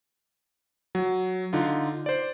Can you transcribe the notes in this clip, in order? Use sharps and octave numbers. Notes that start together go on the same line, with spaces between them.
F#3
D3 D#4 F4
C5 D5